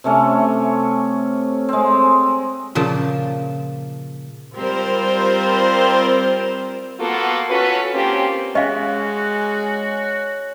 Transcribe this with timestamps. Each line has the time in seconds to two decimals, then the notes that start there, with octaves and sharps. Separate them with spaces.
0.04 C3 A3 C#4
1.69 G#3 C4
2.75 A#2 C#3 F3 A#3 A5
4.56 G3 C4 F4 A#4 C5
7.00 A#3 B3 F4 F#4 A4
7.50 C#4 F4 F#4 A4 B4
7.94 A#3 C4 C#4 F4 G4
8.55 G#3 C#4 F#4 D#5 F5 G#5